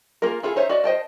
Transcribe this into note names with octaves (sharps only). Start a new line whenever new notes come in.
A#3 F4 G#4 A#4
E4 F4 G#4 A4
D#4 C5 C#5 E5
F#4 D5 D#5
C5 D#5 G5 A5